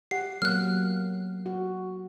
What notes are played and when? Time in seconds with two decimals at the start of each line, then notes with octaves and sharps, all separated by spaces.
0.11 G4 F#5 C7
0.42 F#3 A#3 B3 F6 F#6
1.46 F#4